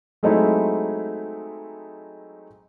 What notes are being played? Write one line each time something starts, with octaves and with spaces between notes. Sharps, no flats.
F#3 G#3 A3 C4 D#4 E4